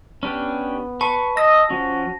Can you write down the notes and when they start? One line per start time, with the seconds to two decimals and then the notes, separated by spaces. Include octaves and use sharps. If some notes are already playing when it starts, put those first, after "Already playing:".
0.23 B3 C#4 D4 G4
1.01 B4 A5 C#6
1.37 D#5 D#6 E6 A#6
1.70 F3 C#4 F#4